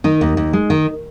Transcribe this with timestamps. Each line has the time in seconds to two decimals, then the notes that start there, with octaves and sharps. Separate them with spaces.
0.04 D#3 D#4
0.21 D#2
0.37 D#2
0.53 G#3
0.70 D#3